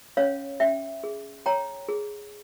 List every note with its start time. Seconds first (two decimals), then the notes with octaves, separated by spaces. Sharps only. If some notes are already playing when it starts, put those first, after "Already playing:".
0.17 C#4 C#5 F5
0.60 C#4 E5 G5
1.04 G#4
1.46 C#5 G5 A#5
1.89 G#4